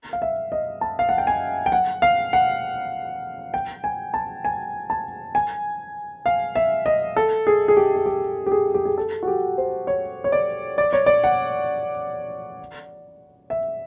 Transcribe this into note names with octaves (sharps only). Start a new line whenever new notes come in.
F5
E5
D#5
A5
F5
F#5
G5
G#5
G5
F#5
F5
F#5
G5
G#5
A5
G#5
A5
G#5
F5
E5
D#5
A4
G#4
G#4
G4
G#4
G4
G4
G#4
G4
G#4
A4
F#4
G4
C5
C#5
C#5
D5
D5
C#5
D5
F#5
E5